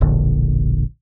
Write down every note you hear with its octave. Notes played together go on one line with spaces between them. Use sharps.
E1 A#1 D3